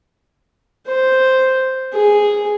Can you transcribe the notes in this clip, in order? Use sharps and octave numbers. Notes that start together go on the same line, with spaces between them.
C5
G#4